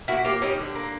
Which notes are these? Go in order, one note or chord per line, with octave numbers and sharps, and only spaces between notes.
A#3 E4 F#4
A#3 F4 G4
G3 C#4 D#4
D3
A#3